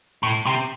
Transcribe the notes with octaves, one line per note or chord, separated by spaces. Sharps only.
A2
C3